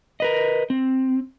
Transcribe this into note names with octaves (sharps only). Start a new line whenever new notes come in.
A#4 B4 D#5
C4